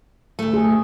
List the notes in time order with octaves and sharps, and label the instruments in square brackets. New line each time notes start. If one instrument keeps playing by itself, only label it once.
[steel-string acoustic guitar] D2 A3
[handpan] G#4